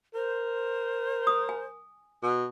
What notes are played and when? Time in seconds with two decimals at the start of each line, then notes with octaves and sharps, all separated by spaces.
0.15 A#4 C5
1.27 D#6
1.49 G#5
2.23 B2